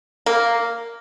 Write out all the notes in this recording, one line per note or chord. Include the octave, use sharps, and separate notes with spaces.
A#3